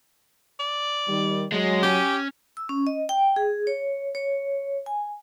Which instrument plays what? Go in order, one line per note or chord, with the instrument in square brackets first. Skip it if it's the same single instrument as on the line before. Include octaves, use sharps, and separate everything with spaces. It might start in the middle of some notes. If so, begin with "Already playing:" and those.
[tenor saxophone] D5
[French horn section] D#3 G3
[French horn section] F#3 [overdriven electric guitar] G#3
[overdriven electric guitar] C#4 [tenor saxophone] G4
[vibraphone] E6
C#4
D#5
G5
G#4
C#5
C#5
G#5